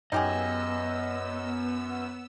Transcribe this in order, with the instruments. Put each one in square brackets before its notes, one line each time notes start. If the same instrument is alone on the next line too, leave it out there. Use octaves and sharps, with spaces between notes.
[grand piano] F#2 [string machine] B3 E6 [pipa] D#4 G4 G#4 [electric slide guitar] D#5